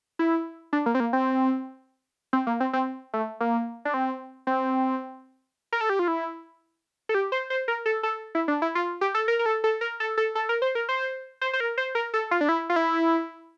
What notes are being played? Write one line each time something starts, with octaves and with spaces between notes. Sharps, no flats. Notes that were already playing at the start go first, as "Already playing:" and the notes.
E4
D4
A#3
C4
A#3
C4
C4
A#3
C4
C4
A3
A#3
D4
C4
C4
A#4
A4
G4
F4
E4
A4
G4
C5
C5
A#4
A4
A4
E4
D4
E4
F4
G4
A4
A#4
A#4
A4
A4
A#4
A4
A4
A4
A#4
C5
A#4
C5
C5
C5
A#4
C5
A#4
A4
F4
D4
E4
F4
E4